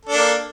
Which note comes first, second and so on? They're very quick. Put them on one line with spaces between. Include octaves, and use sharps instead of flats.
A4 D4 A#3